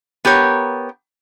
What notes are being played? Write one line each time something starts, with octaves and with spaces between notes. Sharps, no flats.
B3 G4 A#4 C#5